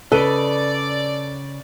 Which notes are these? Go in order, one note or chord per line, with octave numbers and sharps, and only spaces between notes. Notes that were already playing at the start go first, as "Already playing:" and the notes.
C#3 A4 B4 D5 D#5